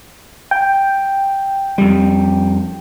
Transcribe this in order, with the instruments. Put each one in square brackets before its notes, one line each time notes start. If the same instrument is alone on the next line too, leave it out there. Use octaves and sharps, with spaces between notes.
[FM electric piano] G5
[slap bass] F2 G3